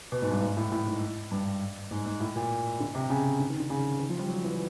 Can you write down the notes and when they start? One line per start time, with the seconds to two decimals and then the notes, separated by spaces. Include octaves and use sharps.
0.12 B2
0.22 G#2
0.31 G2
0.41 G#2
0.57 A2
0.72 A2
0.86 G#2
1.31 G2
1.91 G#2
2.06 G#2
2.20 A2
2.36 A#2
2.80 D3
2.95 C3
3.10 C#3
3.40 D3
3.50 D#3
3.60 D3
3.70 C#3
3.99 D#3
4.09 F3
4.19 G3
4.29 F#3
4.44 E3